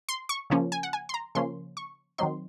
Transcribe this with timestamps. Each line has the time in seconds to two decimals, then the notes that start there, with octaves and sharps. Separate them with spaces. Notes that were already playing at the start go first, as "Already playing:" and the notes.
0.09 C6
0.29 C#6
0.50 C#3 F3 A#3 C#4
0.72 G#5
0.83 F#5
0.93 G#5
1.09 C6
1.14 A#5
1.35 C#3 F3 A#3 C#4 C6
1.77 C#6
2.18 D#3 F#3 C4 D#4 C6